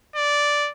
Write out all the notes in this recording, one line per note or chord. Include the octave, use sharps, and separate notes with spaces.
D5